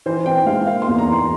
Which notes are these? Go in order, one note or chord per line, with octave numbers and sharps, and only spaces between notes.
E3 C5
C4 G5
G#3 F5
A#3 F5
C6
E2
A#5
E3 C6